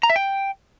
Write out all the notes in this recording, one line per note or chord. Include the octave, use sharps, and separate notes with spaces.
A#5
E5
G5